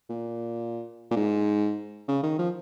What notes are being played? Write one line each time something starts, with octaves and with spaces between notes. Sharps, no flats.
A#2
A#2
G#2
C#3
D#3
F3